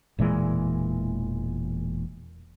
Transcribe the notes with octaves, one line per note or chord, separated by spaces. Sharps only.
E1 A#2 E3 G#3